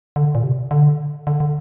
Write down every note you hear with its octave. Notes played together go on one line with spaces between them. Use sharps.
D3
A#2
C3
D3
D3
D3